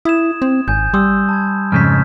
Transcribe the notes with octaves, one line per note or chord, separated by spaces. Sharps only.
E4 D#6 G#6 E7
C4
G#1 G#5 G6
G3 C6 D#6 E6
A5 B5 G#6
F2 G#2 C#3 F6 G6 B6